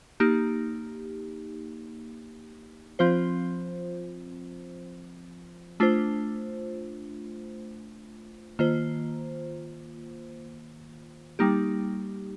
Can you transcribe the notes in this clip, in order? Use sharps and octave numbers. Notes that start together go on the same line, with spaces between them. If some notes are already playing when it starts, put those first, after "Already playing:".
A#3 D#4 G4
F3 C4 F4 C5
A3 D4 F4 C5
D#3 A#3 F4 C5
G3 A#3 D#4 G4